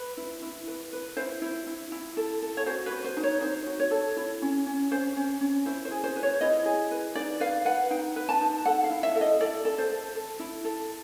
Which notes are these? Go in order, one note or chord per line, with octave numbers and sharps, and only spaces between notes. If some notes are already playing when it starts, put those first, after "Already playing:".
Already playing: B4
E4
E4
B4
B4
E4 C5
E4
E4
E4
A4
A4
C#5
F#4 C5
B4
F#4
C5
D#4
C#5
D#4 C5
F#4
C#5
A4
E4
C#4
C#4
C#4 C5
C#4
C#4
E4 C5
C5
G#4
C5
B4
C#5
E4 D#5
G#4
B4
D#4 D5
B4 F5
B4 F#5
D#4 G5
B4
A5
D#4
A4 F#5
F5
E4
E5
A4
D#5
A4 D5
A4
C5
A4
A4
E4
A4